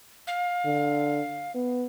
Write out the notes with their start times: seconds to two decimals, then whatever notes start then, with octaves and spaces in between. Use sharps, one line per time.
0.27 F5
0.65 D3
1.55 B3